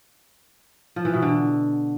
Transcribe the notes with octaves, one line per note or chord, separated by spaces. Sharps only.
F3
E3
B2
D3